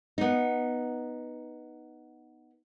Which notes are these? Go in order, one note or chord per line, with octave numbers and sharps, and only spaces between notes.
B3 D#4